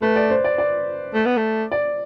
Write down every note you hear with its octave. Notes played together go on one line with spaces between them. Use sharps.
A3 B4
D5
C5
D5
D5
A3
B3
A3
D5